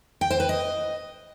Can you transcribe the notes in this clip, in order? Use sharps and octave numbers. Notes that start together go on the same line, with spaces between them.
G5
C5
B4
D#5